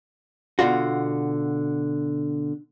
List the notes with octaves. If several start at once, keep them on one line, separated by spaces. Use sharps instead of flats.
B2 D3 F4 F#4